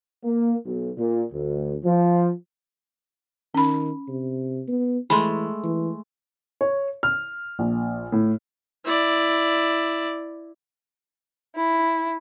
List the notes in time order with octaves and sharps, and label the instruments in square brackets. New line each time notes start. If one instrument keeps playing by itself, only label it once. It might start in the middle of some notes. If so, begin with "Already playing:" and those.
[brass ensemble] A#3
B1
A#2
D2
F3
[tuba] D#3 [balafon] C#4 B5
[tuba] C3
B3
[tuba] E3 [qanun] G#3 A3 [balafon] B5 C6
[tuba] E3
[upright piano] C#5
F6
A#1
A2
[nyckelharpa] E4 D5
[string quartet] E4